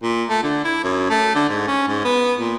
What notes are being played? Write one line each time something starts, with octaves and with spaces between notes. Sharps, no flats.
A#2
A3
D3
E4
F#2
A3
D3
G#2
C#4
G#2
B3
A#2